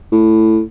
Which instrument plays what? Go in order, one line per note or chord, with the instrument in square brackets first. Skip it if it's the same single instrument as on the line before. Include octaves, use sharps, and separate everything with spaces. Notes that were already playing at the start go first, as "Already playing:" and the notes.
[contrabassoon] A2